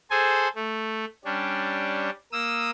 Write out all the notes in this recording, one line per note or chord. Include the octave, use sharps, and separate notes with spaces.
G#4 A4 C5 G#5
A3
G3 C#4 D4
A#3 D#6 E6